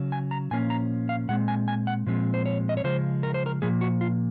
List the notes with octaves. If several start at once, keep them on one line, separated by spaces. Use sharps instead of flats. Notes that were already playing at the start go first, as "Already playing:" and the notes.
Already playing: C#3 F#3 C#4
G#5
A#5
A#2 F3 A#3 C#4 G#5
A#5
F5
A#2 G#3 C4 F#5
G#5
G#5
F#5
A#2 F3 G#3 C4
C5
C#5
D#5
C#5
C#3 F3 G#3 C5
A#4
C5
A#4
A#2 F3 A#3 G#4
F#4
F4